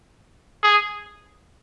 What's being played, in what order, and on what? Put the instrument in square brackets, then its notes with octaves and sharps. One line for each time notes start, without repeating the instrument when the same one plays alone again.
[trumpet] G#4